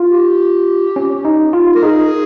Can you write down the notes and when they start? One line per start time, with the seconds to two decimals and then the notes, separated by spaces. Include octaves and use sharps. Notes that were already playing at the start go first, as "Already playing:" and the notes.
Already playing: F4
0.09 G4
0.96 C#4
1.25 D#4
1.53 F4
1.75 A#4
1.83 D#4 G#4